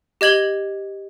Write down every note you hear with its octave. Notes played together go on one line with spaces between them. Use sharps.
G4 D#5 G#6 F#7 G7